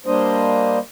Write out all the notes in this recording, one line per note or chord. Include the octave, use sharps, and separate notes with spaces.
G3 A#3 D4 C5 D#5